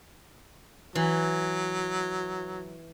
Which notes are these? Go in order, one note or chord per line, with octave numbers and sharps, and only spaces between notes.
E3 F#3